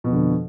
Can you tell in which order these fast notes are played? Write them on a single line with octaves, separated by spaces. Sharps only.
B2 F2 D3